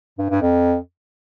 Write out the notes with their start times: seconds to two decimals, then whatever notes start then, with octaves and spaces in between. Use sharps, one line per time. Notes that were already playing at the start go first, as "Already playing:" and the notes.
0.18 G2
0.30 G2
0.42 F2